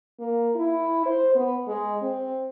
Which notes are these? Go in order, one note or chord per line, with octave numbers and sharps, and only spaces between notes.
A#3
E4
C5
B3
G#3
C4